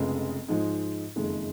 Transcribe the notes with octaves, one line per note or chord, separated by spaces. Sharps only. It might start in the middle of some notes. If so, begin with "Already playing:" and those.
Already playing: F1 F2 C#3 G#3 B3
G#2 F3 G#3 D#4
F#1 F2 D#3 G#3